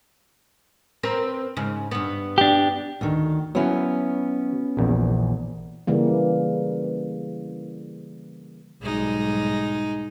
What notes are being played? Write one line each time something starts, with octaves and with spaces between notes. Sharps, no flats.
C4 A#4 B4
G#2 C#3
G2 B3
D4 G4
D2 D#3
F#3 B3 C#4 E4
A#1 E2
C#3 E3 G3 A#3
B1 G#2 G3 G#3 D#4